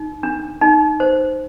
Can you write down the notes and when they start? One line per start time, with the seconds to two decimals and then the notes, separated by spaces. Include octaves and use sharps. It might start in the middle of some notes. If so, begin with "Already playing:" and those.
Already playing: D#4
0.23 D4
0.61 D#4
1.00 C5